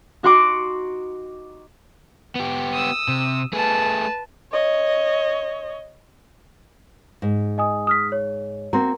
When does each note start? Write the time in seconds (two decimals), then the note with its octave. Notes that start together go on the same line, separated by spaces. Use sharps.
0.23 D#4 F#4 F#5 C6 D6
2.35 B3 G4
2.73 D#6 E6
3.08 C3
3.53 A3 G#4 B4 A5
4.52 C#5 D#5
7.22 G#2
7.58 D#5 G#5 D#6
7.87 D#6 F6 B6
8.12 C#5
8.73 A#3 C4 F#4 A#5 C6